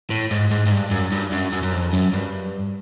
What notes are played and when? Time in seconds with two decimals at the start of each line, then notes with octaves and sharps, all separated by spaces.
0.10 A2
0.31 G#2
0.51 G#2
0.66 G#2
0.71 G2
0.91 F#2
1.12 G2
1.32 F#2
1.52 F#2
1.63 F#2
1.72 F2
1.93 F#2
2.13 G2